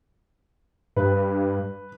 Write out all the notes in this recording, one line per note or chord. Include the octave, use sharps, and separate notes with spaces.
G2 B4